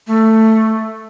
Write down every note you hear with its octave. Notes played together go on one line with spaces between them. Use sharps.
A3